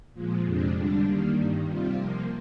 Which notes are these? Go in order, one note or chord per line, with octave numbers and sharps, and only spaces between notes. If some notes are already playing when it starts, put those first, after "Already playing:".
A#2 F3 G#3
F2 C3 F3 G#3 D4
D3 G3 D4
D#3 G3 A#3
G2 D#3 G3
C3 G3 C4 F4
C3 F3 A#3